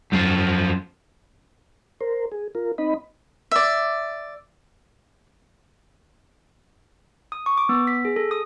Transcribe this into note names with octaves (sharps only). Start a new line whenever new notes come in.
F#2 F3
A#4 C5
G#4
F4 A#4
C4 D#4 D#5 B5
D5 E5
D#6
C#6
D6
B3
B6
G#4
A4
D#6